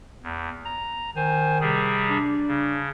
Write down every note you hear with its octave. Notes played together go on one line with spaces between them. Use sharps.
E2
A#5
D#3 C5 G#5
C3 G3 G#4
D4
C#3